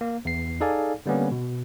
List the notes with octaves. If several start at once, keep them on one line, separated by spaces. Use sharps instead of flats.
A#3
E2 C7
D#4 G#4 A4 D5 F5 G#5
D3 G3 A#3 B3 C#4
B2